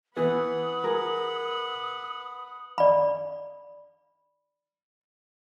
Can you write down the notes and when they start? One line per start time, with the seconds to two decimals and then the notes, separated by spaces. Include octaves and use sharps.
0.16 E3 B3 B4 F#5 D#6
0.84 G#4 A#4
2.78 D5 B5